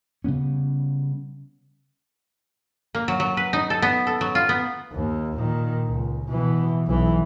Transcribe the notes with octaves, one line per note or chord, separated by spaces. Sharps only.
C#3 G3 B3 C#4
A#3
F#3
F#3
B4
D#4
A4
B3
A4
F#3
F4
B3
D#2
A#2 D#3
C#2
B2 E3
B1 E3